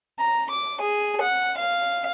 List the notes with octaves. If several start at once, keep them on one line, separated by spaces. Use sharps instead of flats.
A#5
D6
G#4
F#5
F5